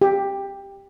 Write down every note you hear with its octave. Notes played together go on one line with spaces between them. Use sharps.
G4